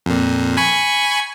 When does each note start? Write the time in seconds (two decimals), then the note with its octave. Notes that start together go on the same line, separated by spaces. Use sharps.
0.06 F2 A#2
0.57 G#5 B5 C#6